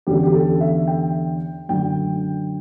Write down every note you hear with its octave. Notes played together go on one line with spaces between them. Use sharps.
E2 D3 G3 C#4 G4
G4
A4
E5
G5
F#2 D3 A3 G5